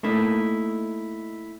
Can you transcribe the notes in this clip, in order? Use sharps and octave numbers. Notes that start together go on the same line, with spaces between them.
A3 A#3 D#4 E4